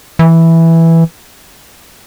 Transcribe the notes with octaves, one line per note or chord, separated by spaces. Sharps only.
E3